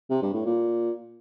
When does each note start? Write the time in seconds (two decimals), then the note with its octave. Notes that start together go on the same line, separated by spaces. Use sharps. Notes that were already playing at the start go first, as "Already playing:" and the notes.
0.10 C3
0.22 G2
0.34 A2
0.45 A#2